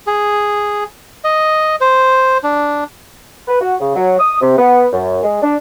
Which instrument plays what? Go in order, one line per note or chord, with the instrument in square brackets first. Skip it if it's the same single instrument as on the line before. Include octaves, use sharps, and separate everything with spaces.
[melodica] G#4
D#5
C5
D4
[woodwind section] B4
F#4
C#3
F#3
D#6
C3
B3
F#2
G#3
D4